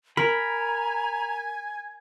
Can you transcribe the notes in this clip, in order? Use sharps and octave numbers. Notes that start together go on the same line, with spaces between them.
A#4 G#5 A#5 B5